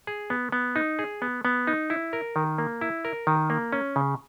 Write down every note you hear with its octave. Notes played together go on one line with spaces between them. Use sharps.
G#4
B3
B3
D#4
G#4
B3
B3
D#4
E4
A#4
D#3
A#3
E4
A#4
D#3
A#3
C#4
C#3